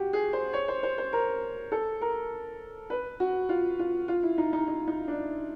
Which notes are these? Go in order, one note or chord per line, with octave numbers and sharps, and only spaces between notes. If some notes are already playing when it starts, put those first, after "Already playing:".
Already playing: F#4 G4
G#4
C5
C#5
C5
C5
C5
A#4
A4
A#4
B4
F#4
F4
F4
F4
E4
D#4
D#4
D#4
D#4
D4